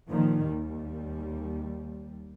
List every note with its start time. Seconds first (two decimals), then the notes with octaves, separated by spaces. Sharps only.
0.11 A#2 D#3 F3
0.47 D#2 G3